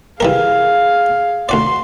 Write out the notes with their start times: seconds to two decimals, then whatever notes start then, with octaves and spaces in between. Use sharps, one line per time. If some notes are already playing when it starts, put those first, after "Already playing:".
0.20 E3 G3 G#4 A#4 F5
1.49 D2 F#4 D5 C6